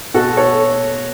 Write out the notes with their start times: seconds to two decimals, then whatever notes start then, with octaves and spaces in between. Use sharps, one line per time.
0.14 B2 F#4 A4
0.37 A4 C#5